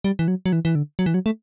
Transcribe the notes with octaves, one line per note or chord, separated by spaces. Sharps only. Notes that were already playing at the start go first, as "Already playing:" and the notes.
G3
E3
F#3
F#3
E3
E3
D3
F#3
E3
F#3
A3